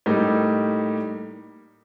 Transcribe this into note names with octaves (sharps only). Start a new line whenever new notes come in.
A2 G3 A#3 D#4 G4